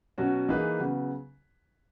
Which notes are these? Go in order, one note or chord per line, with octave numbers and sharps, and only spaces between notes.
B2 F#3 C#4 F#4
E3 A#3 D#4 G#4 B4
C#3 F#3 B3